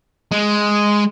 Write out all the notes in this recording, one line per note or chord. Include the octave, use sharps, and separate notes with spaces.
G#3